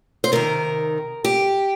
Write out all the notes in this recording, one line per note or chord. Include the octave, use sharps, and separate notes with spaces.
C5
C3 D#3 A#4
G4